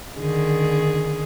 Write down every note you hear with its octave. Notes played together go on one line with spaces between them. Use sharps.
D3 D#3 G#4